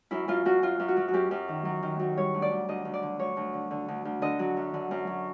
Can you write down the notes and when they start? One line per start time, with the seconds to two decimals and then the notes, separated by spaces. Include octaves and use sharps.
0.11 F#2 E4
0.28 F#2 F4
0.45 F#2 F#4
0.62 F#2 F4
0.80 F#2
0.88 F#4
0.97 F#3
1.08 F#4
1.13 F#2 G4
1.31 F#2
1.48 D#3
1.65 F#3
1.83 D#3
1.99 F#3
2.17 G3 C#5
2.34 D2
2.42 D5
2.51 D2
2.69 D2 D#5
2.85 D2
2.94 D5
3.03 D3
3.19 D2 C#5
3.37 D2
3.54 D3
3.71 D3
3.88 D2
4.05 D2
4.22 D3 D#5
4.39 F#3
4.57 F#2
4.74 D3
4.91 F#2
5.07 F#3